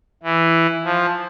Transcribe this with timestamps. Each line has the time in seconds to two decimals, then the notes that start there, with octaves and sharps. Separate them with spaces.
0.23 E3
0.84 F3